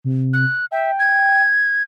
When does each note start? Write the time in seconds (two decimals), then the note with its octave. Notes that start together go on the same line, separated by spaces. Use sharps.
0.04 C3
0.33 F#6
0.72 E5 G5
0.99 G#6